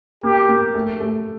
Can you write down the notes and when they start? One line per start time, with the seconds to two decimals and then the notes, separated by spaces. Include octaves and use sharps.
0.23 A#3 G4
0.48 A#3
0.74 A3
1.00 A3